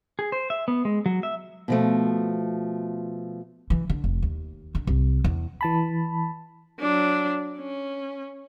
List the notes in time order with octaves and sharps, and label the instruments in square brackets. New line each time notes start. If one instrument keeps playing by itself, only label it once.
[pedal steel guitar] G#4
C5
E5
B3
G#3
F#3
E5
[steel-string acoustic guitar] B2 F3 A3
[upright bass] E3
D3
F1
D#2
D3
C2
E2
[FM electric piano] E3 A5 B5
[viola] F#3 D4
C#4